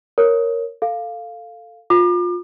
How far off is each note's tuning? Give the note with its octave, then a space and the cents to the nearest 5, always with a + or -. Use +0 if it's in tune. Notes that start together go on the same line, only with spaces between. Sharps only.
A#4 +0 C#5 +0
A4 +10 F5 +0
F4 +20 D6 +35